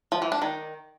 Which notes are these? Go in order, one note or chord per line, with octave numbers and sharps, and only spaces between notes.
F3
E3
D4
D#3